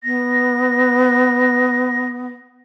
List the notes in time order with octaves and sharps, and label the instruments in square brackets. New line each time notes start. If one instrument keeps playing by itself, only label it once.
[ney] B3 [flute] A#6